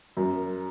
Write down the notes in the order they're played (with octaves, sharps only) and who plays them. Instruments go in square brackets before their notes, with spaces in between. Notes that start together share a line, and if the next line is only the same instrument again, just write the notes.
[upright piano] F#2